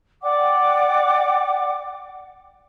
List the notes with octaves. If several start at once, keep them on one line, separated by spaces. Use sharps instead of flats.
D5 F#5 G5 D6